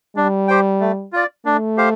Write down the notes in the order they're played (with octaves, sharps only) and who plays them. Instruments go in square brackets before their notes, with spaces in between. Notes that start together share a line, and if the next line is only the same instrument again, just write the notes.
[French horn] G3 [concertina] D4
[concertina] G4 C5 G5
A3
F4 D5
[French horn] A3 [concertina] D4
[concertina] G4 C5 F5